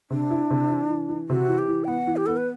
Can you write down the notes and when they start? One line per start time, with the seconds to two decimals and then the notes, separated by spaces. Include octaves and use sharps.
0.10 C3 D4
0.30 E4
0.50 C3
0.70 E3
0.89 E3
1.09 E3
1.29 C3 F#4
1.48 E3
1.58 G4
1.68 E3
1.84 G5
1.87 B3 F#5
2.07 E3
2.17 G4
2.26 B3 A4
2.37 B4